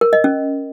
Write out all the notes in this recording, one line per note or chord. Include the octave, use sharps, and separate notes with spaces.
A#4
D#5
C#4